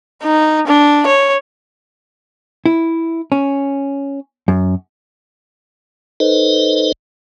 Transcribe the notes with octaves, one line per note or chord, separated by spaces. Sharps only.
D#4
D4
C#5
E4
C#4
F#2
D#4 A4 B4 C5 D#5